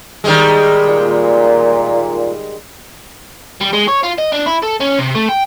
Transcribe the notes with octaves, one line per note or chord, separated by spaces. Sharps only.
D#3 G3 G#3
A#2
G3
G#3
C#5
F4
D#5
D4
E4
A4
C#4
C3
A3
G5